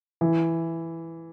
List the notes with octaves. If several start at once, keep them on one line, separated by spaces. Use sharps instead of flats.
E3